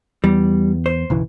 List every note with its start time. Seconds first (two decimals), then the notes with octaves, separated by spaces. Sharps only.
0.24 E2 G3
0.86 C5
1.10 F#1 B1 E3